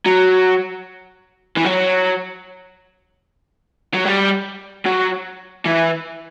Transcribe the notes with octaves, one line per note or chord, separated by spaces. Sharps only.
F#3
E3
F#3
F#3
G3
F#3
E3